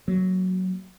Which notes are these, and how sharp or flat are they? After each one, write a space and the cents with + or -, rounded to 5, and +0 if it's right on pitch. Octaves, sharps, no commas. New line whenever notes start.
F#3 +0 A#3 -15